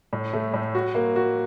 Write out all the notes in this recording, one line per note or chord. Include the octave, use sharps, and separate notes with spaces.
A2
A3
A2
F#4
A#3
F#4